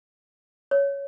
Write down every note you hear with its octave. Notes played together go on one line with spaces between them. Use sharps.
C#5